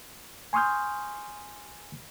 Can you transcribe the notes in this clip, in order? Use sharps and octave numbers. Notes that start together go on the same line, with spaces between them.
G#5 C6 C#6 D#6 F6 G6